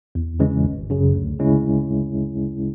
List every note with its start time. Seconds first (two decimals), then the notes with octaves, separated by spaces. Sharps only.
0.15 E2
0.40 C#3 E3 G#3 C#4
0.65 G#1
0.90 F#2 C#3
1.14 D2
1.39 C#3 G#3 C#4 E4